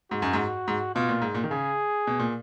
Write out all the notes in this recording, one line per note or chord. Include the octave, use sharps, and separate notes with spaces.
G#2 F#4
F#2
G#2
G#2
B2 F4
A#2
G#2
A#2
D#3
C#3 G#4
B2
A#2